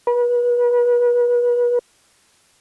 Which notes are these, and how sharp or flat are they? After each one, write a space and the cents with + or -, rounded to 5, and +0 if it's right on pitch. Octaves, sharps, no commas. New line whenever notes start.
B4 -35